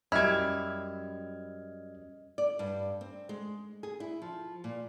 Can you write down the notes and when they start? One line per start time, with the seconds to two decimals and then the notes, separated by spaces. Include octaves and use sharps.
0.12 F#2 G3 E4 D#5 F6 G#6
2.38 D5
2.59 G2
3.01 C4
3.29 G#3
3.83 G#4
4.00 E4
4.22 F3
4.64 A#2